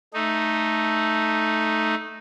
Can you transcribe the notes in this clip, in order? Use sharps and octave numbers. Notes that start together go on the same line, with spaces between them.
A3 D#4